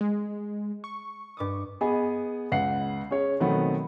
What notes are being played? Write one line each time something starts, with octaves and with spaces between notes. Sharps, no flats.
G#3
C#6
G2 D6 D#6
B3 G#4 D#5 G#5
C#2 B4 F#5 C7
C#4 G#4 C#5
B2 D#3 F#3 A3 B3 C4